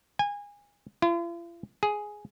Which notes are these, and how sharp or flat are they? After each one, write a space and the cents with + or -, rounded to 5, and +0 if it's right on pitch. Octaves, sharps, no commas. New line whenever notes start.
G#5 -25
F4 -45
G#4 +5